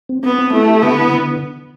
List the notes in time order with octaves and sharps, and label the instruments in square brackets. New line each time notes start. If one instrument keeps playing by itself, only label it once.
[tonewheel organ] C4
[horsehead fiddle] B3 [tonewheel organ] C4
[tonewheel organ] C4
[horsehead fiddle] A3 [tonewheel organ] E4
[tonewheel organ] G4
[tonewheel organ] D3 [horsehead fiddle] B3
[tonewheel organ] E4
D3